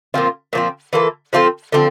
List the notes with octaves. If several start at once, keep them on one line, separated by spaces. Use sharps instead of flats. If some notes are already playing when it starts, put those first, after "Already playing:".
A#2 F3 C4 F4
A#2 F3 C4
E3 A#3 F4 A4
F3 C4 F4 A4
D3 F3 C4